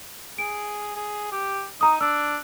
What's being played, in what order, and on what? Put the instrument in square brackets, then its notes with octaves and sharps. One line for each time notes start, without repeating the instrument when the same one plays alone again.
[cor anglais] G#4 [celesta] D7
[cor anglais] G#4
G4
[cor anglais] D#4 [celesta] A#5 D#6
[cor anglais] D4 [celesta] E6